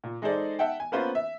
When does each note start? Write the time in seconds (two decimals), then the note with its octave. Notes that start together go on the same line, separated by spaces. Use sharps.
0.04 A#2
0.22 G#3 D#4 G#4 A4 C5 D5
0.59 E5 F#5 G5 A5
0.80 G#5
0.92 A#3 B3 C#4 F4 B4 C5
1.15 E5